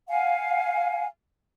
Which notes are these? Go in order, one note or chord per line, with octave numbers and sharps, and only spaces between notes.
F5 F#5 G#5